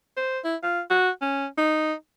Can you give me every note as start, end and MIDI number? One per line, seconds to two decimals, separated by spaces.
0.16 0.39 72
0.44 0.56 64
0.63 0.81 65
0.90 1.09 66
1.21 1.46 61
1.58 1.93 63